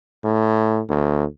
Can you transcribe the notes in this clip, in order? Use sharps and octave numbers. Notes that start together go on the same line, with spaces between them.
A2
D2